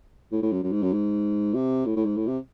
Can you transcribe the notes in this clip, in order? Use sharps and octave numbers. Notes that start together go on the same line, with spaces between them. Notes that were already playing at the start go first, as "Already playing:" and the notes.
A2
A2
F#2
F#2
G#2
F#2
G#2
C3
A2
A2
G#2
A2
C3